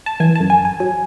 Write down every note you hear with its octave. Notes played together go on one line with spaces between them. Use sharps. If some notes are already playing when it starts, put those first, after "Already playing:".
A5
E3 G#5
A5
F#2
G#5
G#1 G#5
F#3 G#5